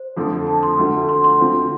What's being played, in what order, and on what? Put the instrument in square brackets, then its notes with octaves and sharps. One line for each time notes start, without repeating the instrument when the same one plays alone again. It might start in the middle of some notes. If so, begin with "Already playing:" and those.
Already playing: [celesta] C5
[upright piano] F2 D3 F3 A3
[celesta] A5
C6
[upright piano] D2 D3 F3 A3
[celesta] C6
C6
[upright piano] D2 D3 F3 C4 F4